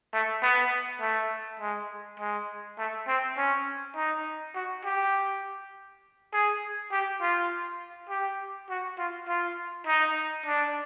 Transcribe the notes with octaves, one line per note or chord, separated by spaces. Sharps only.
A3
B3
A3
G#3
G#3
A3
C4
C#4
D#4
F#4
G4
G#4
G4
F4
G4
F#4
F4
F4
D#4
D4